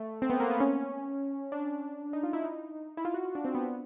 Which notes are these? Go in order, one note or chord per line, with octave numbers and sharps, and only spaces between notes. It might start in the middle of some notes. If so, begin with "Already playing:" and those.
Already playing: A3
C4
B3
A#3
B3
C#4
D4
D#4
F4
E4
D#4
E4
F4
F#4
F4
D4
C4
B3
B3